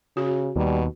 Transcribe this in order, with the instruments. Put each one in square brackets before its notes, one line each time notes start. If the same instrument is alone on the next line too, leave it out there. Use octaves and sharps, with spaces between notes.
[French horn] C#3 [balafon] F#4
[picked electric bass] D#2 [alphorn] B2 [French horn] G3